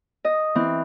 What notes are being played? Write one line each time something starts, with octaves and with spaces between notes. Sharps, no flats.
D#5
E3 C4